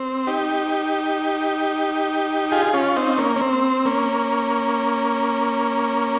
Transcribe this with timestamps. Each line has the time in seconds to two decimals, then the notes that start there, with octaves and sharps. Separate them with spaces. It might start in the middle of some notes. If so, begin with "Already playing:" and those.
Already playing: C4
0.27 D#4 G4
2.52 F4 G#4
2.73 C#4 F4
2.96 C4 D#4
3.18 A#3 C#4
3.36 C#4
3.41 C4
3.85 A#3 C#4